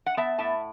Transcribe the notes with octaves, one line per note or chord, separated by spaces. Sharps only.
F#5
B3 E5 A5
A2 E5 A5